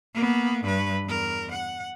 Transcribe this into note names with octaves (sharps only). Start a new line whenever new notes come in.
A#3 B3
G2 B4
E2 A#4
F#5